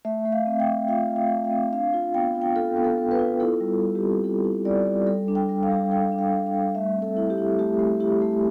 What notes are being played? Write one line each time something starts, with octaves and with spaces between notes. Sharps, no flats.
A3 E5
A3
F5
C4
G5
A3
F4 F5
A3
F5
A3
F5
C4
D4 F5
F4
B3 G5
F4
G5
F4 A4
B3
A4
B3
B4
F4
E4 A4
G3
G3
G4
C4
E4 A4
E4
G3 D5
G3
G3 A4
D4
G5
G3
F5
G3
G3 G5
D4
F5
G3
F5
G3
A3 E5
C4
A4
E4
G4
E4
A3 G4
A3
E4 G4
A3